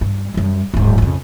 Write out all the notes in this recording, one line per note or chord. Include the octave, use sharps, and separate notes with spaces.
G2
F#2 G3
D1 G#2
F2 C#3